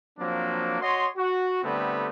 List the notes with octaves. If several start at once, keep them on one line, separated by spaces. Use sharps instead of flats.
F3 F#3 A#3 C4 D4
F#4 C#5 D#5 C6
F#4
D3 G3 A3 B3 C4